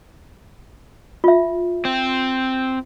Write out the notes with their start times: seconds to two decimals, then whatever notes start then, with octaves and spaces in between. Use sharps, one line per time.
1.24 F4 E5
1.85 C4